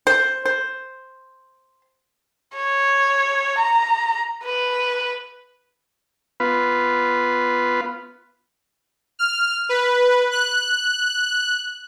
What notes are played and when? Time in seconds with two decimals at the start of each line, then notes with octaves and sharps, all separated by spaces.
0.07 C5
0.45 C5
2.55 C#5
3.58 A#5
4.44 B4
6.40 B3 F4 B4
9.19 F6
9.69 B4
10.31 F#6